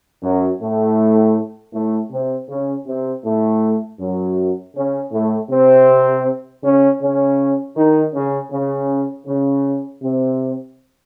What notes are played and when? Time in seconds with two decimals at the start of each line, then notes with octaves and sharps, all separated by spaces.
0.23 F#2 F#3
0.60 A2 A3
1.73 A2 A3
2.11 C3 C4
2.49 C#3 C#4
2.87 C3 C4
3.24 A2 A3
3.99 F#2 F#3
4.75 C#3 C#4
5.12 A2 A3
5.50 C3 C4
6.63 C#3 C#4
7.02 C#3 C#4
7.77 D#3 D#4
8.14 C#3 C#4
8.52 C#3 C#4
9.27 C#3 C#4
10.02 C3 C4